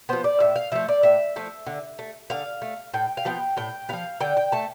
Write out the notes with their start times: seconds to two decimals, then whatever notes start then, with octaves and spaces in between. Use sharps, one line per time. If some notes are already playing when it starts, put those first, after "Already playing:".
0.09 F3 B3 C5
0.24 D5
0.40 A2 E5
0.56 F5
0.72 F3 A3 E5
0.88 D5
1.03 A2 E5
1.36 F3 A3
1.67 D3
1.99 A3
2.30 D3 F5
2.62 A3
2.94 A2 G5
3.17 F5
3.25 F3 B3 G5
3.57 A2 G5
3.89 F3 B3 F5
4.21 D3 G5
4.37 G5
4.52 A3 A5